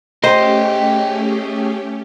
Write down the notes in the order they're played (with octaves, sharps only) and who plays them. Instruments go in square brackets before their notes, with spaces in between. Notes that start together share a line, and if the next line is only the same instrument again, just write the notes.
[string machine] A3 C#4 G4 [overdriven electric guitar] G#4 G5 [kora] C5 [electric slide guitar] D#5